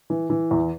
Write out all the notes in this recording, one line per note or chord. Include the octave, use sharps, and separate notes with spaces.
E3
E3
E2